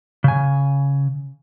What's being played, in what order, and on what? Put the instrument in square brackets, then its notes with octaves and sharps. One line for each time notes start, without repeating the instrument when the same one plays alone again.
[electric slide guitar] C#3 G#5